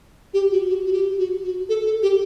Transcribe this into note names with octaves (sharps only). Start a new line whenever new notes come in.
G4
F#4
F#4
F#4
G4
F#4
F#4
A4
A4
G4